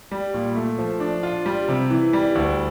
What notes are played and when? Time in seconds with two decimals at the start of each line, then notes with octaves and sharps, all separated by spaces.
0.11 G3
0.34 A#2
0.55 A3
0.78 F3
1.00 D4
1.23 F4
1.46 G3
1.69 C3
1.90 E3
2.13 G3
2.35 D2